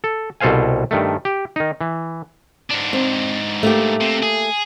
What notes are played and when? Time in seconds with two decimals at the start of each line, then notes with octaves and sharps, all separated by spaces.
0.04 A4
0.41 C2 B2 A4 C5 F5 G#5
0.91 G2 D#3 A3
1.25 G4
1.56 D#3 D#4
1.81 E3
2.71 G#2 D4
2.93 C4
3.63 A3 A#3 G4
4.00 C3
4.23 G#4